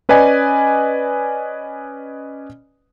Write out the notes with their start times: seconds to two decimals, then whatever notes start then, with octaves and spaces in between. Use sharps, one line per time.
0.09 C#4 B4 D5 D#5 G#5